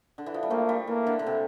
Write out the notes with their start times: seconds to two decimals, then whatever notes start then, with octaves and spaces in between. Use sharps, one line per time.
0.18 D3
0.26 E3
0.34 F3
0.43 G3
0.50 F3 A3 A#3
0.69 G3
0.87 E3 A#3
1.07 D3
1.19 D3
1.27 C3